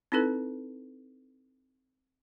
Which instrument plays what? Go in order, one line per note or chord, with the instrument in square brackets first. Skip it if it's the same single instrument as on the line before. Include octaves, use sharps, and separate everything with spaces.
[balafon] C4 D#4 E4 A4 B4